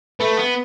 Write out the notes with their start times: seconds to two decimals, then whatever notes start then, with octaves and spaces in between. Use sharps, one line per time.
0.20 A3 B4
0.37 B3